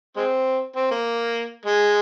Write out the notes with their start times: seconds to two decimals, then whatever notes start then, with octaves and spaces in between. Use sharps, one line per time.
0.17 G#3 C4
0.76 C4
0.91 A#3
1.66 G#3